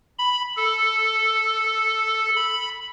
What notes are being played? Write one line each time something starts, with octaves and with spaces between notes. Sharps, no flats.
B5
A4
B5